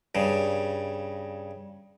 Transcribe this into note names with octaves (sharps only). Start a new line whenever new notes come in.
G2 C#3